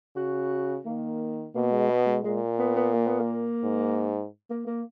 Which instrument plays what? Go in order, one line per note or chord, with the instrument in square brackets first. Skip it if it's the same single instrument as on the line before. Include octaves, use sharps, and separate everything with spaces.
[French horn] C#3 [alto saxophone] F#4
[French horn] D#3 [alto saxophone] A#3
[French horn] B2 [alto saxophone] A#3
[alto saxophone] G#3
B3
G#3
[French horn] A#2 [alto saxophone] G#3
[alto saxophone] B3
B3
A#3
B3
A#3
[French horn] G#2
[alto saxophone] A#3
A#3